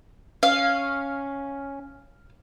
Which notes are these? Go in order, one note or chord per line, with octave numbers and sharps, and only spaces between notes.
C#4 F5